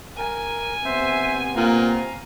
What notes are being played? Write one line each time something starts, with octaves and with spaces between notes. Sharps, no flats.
A#4 G#5
C3 B3 C4 C5 E5
A#2 F5 A#5